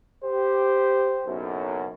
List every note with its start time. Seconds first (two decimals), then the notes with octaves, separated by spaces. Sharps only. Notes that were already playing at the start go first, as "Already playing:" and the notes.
0.24 G4 C5
1.26 F#1 B1 F#2